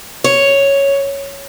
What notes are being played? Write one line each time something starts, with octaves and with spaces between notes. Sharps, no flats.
C#5